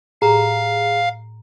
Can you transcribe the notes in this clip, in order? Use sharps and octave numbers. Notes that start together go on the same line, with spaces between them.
A2 G4 G#4 F5 A#5